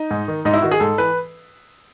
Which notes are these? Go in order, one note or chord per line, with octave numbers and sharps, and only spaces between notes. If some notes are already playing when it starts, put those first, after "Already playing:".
Already playing: D#4
G#2
D#3
G#2 D#4
E4
D#3 F#4
G#4
G#2 A4
E3 B4